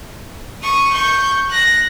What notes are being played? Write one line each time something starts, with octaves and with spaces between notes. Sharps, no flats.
C#6 D#6
C#6 G6
F#6 A#6